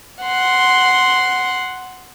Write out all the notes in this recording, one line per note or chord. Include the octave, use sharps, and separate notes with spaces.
F#5 C6